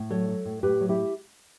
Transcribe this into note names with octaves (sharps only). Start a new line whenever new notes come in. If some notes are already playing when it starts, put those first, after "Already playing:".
Already playing: A2
F#3 A4 C#5
F#3
A2
A2 G4 B4
F#3
E4 G4